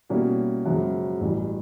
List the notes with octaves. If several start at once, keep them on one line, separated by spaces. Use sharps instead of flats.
B2 G3 A#3 C#4 E4
F#2 C#3 F3 G#3
A1 G2 E3